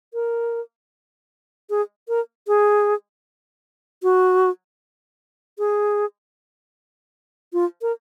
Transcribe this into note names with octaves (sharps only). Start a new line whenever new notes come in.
A#4
G#4
A#4
G#4
F#4
G#4
F4
A#4